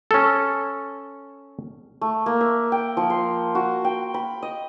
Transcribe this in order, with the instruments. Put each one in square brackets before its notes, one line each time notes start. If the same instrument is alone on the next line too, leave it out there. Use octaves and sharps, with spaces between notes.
[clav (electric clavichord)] C#4 A4
[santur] A3
A#3
E5
G5
F3
C6
F#4
G5
B5
D#5